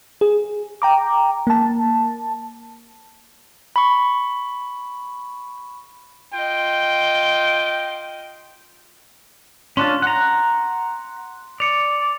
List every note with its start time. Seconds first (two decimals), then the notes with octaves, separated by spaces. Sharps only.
0.21 G#4
0.82 G5 A#5 D6
1.47 A#3 A5
3.76 B5 C#6
6.33 F4 D#5 G5
9.77 C#4 D4 F4 C6
10.02 F#5 A#5
11.60 D5 C#7 F7